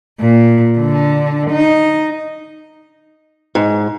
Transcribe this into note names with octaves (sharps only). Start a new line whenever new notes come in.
A#2
D3
D#4
G#2